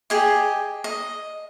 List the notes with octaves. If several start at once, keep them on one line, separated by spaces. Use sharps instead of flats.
G4 G#4 D#5
D#5